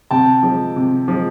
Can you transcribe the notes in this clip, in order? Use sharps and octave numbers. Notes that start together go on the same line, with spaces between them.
C3 G5 A5
F3 G#3
C3
F3 G#3